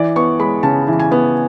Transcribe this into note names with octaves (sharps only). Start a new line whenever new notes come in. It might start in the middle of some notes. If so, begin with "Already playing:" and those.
Already playing: E3 D5
B3 C#6
G#3 B5
C#3 A5
E3
G#5
B3